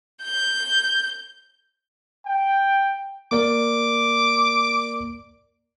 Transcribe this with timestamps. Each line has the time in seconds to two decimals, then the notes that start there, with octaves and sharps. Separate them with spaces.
0.23 G6
2.26 G5
3.32 A#3 A#4 D5 D6